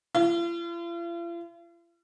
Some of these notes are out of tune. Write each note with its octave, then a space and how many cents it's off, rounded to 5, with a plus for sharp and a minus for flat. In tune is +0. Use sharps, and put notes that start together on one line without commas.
F4 -45